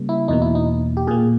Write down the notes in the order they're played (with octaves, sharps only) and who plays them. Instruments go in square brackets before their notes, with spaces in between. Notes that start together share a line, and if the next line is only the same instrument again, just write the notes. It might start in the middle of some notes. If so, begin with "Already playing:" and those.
Already playing: [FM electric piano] C#3 G3 A#3
E4
E2 B2 A#3 D#4
E4
D#4
G4
A#2 A#3 G#4